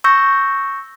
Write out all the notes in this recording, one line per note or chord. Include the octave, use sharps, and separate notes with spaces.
C#6 E6 G6 A#6